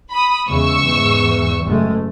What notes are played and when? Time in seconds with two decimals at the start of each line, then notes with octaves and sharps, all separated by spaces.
0.12 B5 D#6
0.48 E2 C#3 G#3 C#6 E6
0.84 E2 G#2
1.64 F#1 G#3 A3